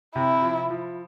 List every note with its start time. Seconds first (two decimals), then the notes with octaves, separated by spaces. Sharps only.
0.15 C3 E4
0.42 F3
0.70 F3